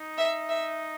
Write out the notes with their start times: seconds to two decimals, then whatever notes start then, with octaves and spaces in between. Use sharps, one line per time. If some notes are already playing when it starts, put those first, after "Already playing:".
Already playing: D#4
0.18 E5
0.49 E5